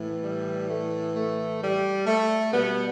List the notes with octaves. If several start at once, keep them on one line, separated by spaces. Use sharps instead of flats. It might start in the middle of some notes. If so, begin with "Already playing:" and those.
Already playing: A2 E3
G3
A3
A3
G3
A3
B2 G3 B3